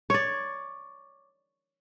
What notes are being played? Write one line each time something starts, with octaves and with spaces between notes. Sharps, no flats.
C#5 D5